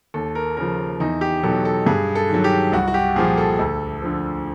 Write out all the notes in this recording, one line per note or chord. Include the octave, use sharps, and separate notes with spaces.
D#2 A4
A#4
C#3 F3 A#4
E2 D#4
G4
B2 F#3 A4
A4
G2 G#4
A4
D#3 F#3
G4
C2 F#4
F#4
G4
A#2 F3 G#4
A4
D2
D3 F3